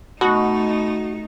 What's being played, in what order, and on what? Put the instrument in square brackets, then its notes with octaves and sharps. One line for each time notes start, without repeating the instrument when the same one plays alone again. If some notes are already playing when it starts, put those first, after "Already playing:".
[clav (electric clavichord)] B2 [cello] A3 D#4 [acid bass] F#4